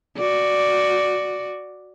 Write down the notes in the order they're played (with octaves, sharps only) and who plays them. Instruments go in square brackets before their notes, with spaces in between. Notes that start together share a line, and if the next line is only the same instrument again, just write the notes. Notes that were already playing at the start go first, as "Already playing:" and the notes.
[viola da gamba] F#4 D5